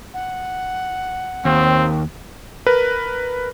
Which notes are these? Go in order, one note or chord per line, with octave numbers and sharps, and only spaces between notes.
F#5
D#2 C4
A#4 B4